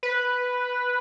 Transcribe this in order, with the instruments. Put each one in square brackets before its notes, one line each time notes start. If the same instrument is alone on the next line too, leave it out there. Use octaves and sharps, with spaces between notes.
[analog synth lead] B4